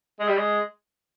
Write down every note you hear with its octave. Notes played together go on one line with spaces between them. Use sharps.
G#3
G3
G#3